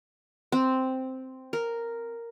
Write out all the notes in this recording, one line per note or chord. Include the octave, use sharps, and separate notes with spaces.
C4
A#4